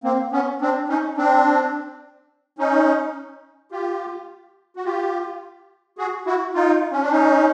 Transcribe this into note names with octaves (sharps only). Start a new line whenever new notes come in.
A#3 C4
B3 C#4
C4 D4
C#4 D#4
C4 D4
C#4 D#4
F4 G4
F#4
F4 G4
F#4 G#4
E4 F#4
D#4 F4
C#4
D4
C#4 D#4